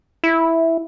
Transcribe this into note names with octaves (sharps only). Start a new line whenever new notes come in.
E4